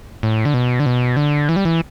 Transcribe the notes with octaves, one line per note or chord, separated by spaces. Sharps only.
A2
D3
B2
D3
B2
D3
E3
G3
E3